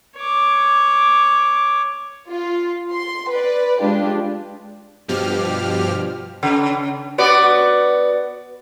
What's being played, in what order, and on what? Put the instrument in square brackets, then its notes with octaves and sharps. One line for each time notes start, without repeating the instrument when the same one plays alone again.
[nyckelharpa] C#5 D6
[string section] F4
C6
B4 D5
G#3 D4 F4 G4
[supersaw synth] G2 B2 F3 G4 F6
[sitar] C#3
B3 F#4 D5